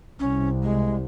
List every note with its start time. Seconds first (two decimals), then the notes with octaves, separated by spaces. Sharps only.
0.20 C2 C#4
0.63 G#3